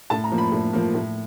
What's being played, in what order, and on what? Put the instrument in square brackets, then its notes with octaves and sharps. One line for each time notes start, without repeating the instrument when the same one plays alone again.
[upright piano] A2 A5
A#5
F3 A#3
B5
A2
F3 A#3
A2